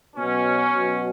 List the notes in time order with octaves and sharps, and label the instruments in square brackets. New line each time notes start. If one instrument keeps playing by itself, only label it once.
[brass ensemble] B2 F#3 C#4
B2 F#3